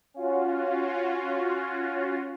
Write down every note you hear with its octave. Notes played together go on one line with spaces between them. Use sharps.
C#4 F4 F#4